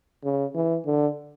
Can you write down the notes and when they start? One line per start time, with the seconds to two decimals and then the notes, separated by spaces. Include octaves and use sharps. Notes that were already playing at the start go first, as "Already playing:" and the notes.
0.24 C#3
0.55 E3
0.86 D3